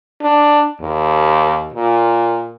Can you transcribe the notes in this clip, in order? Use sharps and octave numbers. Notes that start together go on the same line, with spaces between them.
D4
D#2
A#2